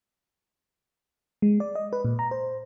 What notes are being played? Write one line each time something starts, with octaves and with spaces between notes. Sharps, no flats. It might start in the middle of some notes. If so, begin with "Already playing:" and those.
G#3
D5
D#5
B4
A#2
A#5
C5